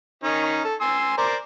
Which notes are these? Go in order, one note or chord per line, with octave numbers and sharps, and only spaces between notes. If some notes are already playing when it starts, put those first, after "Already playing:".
D#3 C#4 D#4
A4
G#5 C6 E6
A#4 C5 D5